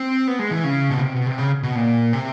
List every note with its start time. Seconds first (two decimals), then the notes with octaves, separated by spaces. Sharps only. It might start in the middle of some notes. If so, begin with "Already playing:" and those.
Already playing: C4
0.27 B3
0.39 G#3
0.51 E3
0.64 C#3
0.90 B2
1.02 C3
1.13 B2
1.26 C3
1.38 C#3
1.63 B2
1.75 A#2
2.13 C3